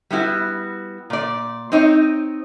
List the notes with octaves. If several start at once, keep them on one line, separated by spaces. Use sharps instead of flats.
G3 B3 E4 F#4
A#2 D5
C4 D#4 C#5